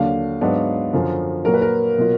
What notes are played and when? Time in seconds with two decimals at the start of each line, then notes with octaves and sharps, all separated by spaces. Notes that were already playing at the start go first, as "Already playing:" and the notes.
Already playing: D#2 D3 F#3 D4 F5
0.41 G#2 F#3 B3 D4
0.93 F#2 D3 F3
1.45 A#2 F#3 A#3 A#4
1.54 B4
1.62 A#4
1.98 B2 F#3 A#3 F4